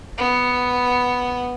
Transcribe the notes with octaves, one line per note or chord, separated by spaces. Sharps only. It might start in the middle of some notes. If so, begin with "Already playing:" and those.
B3